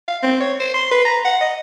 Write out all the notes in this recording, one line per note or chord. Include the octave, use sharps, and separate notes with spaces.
F5
C4
C#5
C5
C6
B4
A#5
F#5
D#5